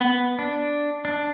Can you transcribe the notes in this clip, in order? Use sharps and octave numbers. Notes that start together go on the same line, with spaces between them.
B3
D4
D4